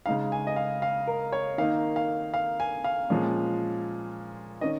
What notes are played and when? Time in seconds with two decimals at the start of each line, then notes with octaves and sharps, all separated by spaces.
0.06 C#3 G#3 D#4 F5
0.32 G#5
0.47 D#5
0.56 F5
0.82 F5
1.07 A#4
1.32 C#5
1.58 D#3 A#3 D#4 F5
1.96 F5
2.34 F5
2.60 G#5
2.84 F5
3.10 A#2 F3 G#3 C#4
4.61 D#3 C#4 D#5